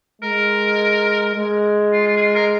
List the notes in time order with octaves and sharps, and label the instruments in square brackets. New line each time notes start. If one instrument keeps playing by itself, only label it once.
[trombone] G#3 [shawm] A#4
[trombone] G#3
[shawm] F4
F4
G#4
F4
A#4